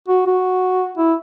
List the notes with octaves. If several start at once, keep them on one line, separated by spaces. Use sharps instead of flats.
F#4
F#4
E4